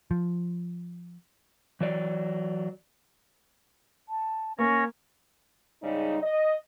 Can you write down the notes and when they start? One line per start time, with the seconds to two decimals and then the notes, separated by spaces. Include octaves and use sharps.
0.11 F3
1.81 E3 F#3 D5
4.09 A5
4.59 A#3 C#4 C#5 A#6
5.83 G#2 C#3 G3 D#4
6.22 D#5